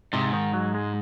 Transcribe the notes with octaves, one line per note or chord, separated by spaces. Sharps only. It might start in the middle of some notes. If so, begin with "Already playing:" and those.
G#2 C3
D#3
F#3
G#3